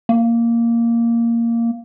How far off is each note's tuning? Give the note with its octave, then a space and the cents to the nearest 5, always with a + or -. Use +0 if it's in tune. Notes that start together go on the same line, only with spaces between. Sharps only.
A#3 -5